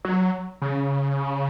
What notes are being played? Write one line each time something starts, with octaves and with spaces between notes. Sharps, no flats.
F#3
C#3